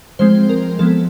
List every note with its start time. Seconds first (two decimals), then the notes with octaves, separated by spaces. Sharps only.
0.19 F3 G#3 C4 C5
0.49 A#4
0.79 F3 G#3 B3 A4